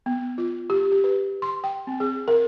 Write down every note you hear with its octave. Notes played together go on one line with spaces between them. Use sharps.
B3
F4
G4
G4
B4
C6
G5
C4
G#4
A#4